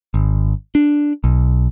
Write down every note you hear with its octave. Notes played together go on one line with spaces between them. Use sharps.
G#1
D4
B1